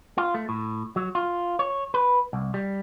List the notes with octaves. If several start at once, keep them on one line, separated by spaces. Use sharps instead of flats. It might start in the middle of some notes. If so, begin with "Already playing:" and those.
F4
A3
A2
F#3
F4
C#5
B4
C2
G3